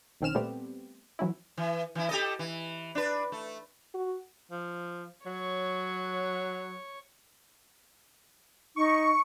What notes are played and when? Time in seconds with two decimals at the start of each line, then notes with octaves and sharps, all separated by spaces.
0.21 B1 D#3 C4 C#4 F6 E7
0.35 A#2 G3 A3 B3 C4 G4
1.19 E3 F#3 C#4 E4
1.57 E3
1.95 E3 E4
2.09 G4 A4 D#5
2.39 E3
2.95 D4 B4
3.32 A3
3.94 F#4
4.51 F3
5.26 F#3 C#5
8.76 D#4 C#6